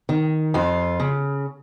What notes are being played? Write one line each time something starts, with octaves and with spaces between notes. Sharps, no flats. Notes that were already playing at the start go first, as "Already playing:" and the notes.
D#3
F2 F4
C#3